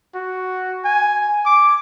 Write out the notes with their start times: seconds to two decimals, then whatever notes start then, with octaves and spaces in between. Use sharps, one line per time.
0.15 F#4
0.84 G#5
1.46 D6